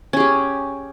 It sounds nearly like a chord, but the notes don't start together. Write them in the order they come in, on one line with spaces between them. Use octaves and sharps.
C#4 G#4 G4